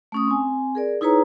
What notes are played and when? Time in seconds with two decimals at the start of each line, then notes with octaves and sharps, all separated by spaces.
0.12 A3 C#4 D#6
0.27 C4 G#5
0.75 G#4 A#4 D5
1.01 D#4 E4 G#4 B4 C#5 A#5